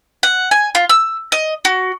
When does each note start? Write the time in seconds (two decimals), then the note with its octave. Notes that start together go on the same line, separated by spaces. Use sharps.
0.23 F#5
0.51 G#5
0.75 F4
0.89 E6
1.32 D#5
1.65 F#4